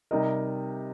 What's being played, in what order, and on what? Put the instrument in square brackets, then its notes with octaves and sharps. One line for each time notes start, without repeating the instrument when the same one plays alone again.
[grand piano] C3 G3 D#4 A#4 D#5